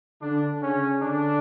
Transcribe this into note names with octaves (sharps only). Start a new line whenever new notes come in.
D3 D4
C#3 C#4
D3 D4